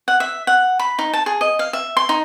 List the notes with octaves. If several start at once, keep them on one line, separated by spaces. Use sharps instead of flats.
F#5
E5
F#5
B5
D#4
A5
G#4
D#5
F5
E5
C6
D#4